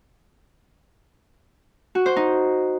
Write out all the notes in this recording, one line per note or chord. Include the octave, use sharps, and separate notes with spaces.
F#4
C5
D#4